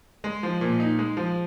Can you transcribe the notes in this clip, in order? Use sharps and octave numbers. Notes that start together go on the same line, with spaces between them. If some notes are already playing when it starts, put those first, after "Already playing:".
G#3
F3
A#2
D#4
G#3
F3